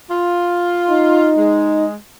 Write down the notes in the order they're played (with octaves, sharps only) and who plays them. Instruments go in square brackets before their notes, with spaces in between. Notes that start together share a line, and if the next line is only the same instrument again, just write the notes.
[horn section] F4
[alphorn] D#4
[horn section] G#3